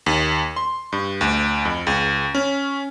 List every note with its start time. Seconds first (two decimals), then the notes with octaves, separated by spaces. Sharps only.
0.06 D#2
0.56 C6
0.92 G2
1.21 D2
1.65 F2
1.87 C#2
2.35 C#4